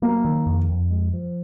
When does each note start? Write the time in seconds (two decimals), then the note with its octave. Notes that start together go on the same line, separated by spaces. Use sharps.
0.02 F#3 A#3
0.24 D#3
0.46 F2
0.69 F2
0.91 G#3
1.13 F3